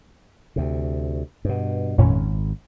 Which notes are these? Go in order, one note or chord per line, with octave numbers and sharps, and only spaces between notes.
D2 C3
G2 B2
G#1 F2 A#2 C#4